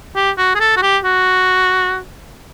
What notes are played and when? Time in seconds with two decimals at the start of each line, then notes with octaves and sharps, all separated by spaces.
0.15 G4
0.37 F#4
0.55 G#4
0.60 A4
0.77 F#4
0.82 G4
1.04 F#4